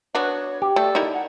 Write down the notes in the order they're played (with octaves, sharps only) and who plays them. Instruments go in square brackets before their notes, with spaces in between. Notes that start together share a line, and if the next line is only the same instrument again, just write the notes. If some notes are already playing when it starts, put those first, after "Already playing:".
[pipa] B3 D4 F#4 [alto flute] C#5
[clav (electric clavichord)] G4
[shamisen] A3 [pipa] A4 [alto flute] D5
[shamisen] D#4 E4 A#4
[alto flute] F#5